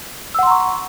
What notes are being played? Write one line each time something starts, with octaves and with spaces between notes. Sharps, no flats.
F#5 A#5 C6 C#6 E6